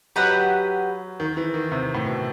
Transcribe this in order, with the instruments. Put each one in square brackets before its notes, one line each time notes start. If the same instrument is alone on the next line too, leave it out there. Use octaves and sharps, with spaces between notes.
[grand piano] F#3 [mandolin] G4 B4 D#5 F#5
[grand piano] D#3
E3
D#3
C3
A2
B2